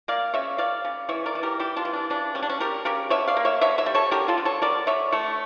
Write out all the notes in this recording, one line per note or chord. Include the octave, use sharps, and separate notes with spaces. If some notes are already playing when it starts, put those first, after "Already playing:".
A#3 D5 F5
C#3 C#5 E5
A#3 D5 F5
C#3
E3 C#5 E5
A#4 D5
E3
G4 A#4
G3 E4 G4
D4 F4
E3
D4
C#3 D4
G3 C#4
D4
C#4
G3 G4 A#4
C#3 G4 A#4
D3 C#5 E5
D5 F5
A#3
C#5 E5
D3 C#5 E5
C#5 E5
G3
A4 C#5
D3 G4 A#4
F4 A4
D3
A4 C#5
D3 A#4 D5
D3 C#5 E5
A3 C#5 E5